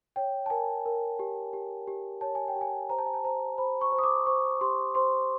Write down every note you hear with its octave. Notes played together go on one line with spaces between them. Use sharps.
C#5 G5
A5
A#4 G#5
A#4
G4
G4
G4
C#5 A5
G#5
G5
G4
G#5
C5 A#5
A5
G#5
A5
C5 A#5
C5 B5
C#6
C5
D#6
D6
C5 C#6
G4 C6
C5 C6